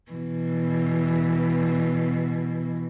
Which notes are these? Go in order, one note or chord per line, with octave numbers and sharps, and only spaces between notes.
B2 E3